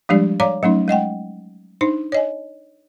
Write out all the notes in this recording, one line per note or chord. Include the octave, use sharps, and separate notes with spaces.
F3 G3 G#3 D4 G4 D5
C#5 D5 F5 A#5 D6
F#3 A3 C#4 D#4
G#3 D#5 F#5 G5
D4 D#4 C5
C#5 D#5 G#5